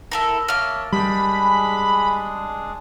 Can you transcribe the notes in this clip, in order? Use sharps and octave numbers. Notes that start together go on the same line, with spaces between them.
E4 A4 A#4
A#3 C#5 E5 A5 F6
G3 G#3 D4 G#4 B5